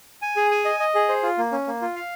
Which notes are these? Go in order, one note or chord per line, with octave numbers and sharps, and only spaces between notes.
G#5
G#4
G#5
D#5
D#5
G#4
C5
F4
A#3
C#4
A#3
F4
F5